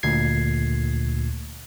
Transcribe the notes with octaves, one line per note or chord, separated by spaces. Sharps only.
D2 A#2 G#6 C7